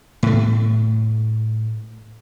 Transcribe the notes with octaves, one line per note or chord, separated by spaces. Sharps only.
A2 A3